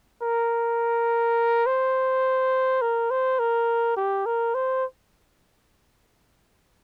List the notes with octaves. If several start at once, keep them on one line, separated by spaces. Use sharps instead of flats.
A#4
C5
A#4
C5
A#4
G4
A#4
C5